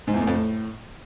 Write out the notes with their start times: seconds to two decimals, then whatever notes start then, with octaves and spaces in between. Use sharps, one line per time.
0.07 G#2
0.14 E2
0.21 A2
0.27 F2
0.34 A2